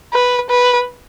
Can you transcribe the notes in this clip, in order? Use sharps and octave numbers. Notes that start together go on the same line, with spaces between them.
B4
B4